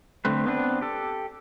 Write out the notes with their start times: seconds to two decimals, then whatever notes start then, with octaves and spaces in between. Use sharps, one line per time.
0.25 D3 A3 C4 B4
0.46 B3 C4 D4 B4
0.81 G4 A4